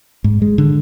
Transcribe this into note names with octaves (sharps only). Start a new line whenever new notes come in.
G#2
G#3
D3